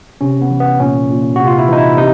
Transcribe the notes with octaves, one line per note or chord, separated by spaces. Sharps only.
C3 C#4
B3
E3
B3
A#2 C#4
A#2
C3 F#4
F4
E4
E3 D#4
E4
C3 D#4